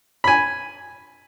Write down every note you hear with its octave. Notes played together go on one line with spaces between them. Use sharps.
G#5 B5